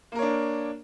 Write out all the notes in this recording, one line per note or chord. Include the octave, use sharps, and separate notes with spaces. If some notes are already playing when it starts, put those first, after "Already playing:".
A#3 D4 A#4 C#5